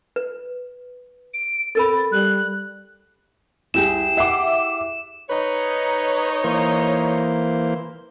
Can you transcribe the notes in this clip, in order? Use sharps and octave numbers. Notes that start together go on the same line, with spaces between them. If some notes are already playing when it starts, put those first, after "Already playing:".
B4
D7
C4 A4 A#4 C5 B5 A6
G3 F#6
C2 E4 G4 G#4 E7
E5 F#5 D6 C7
D#4 B4 C#5
E3 A#3 C5